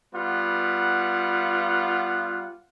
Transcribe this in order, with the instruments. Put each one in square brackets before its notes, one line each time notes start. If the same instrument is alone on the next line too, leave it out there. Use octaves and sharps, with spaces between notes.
[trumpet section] G3 B3 F4 F#5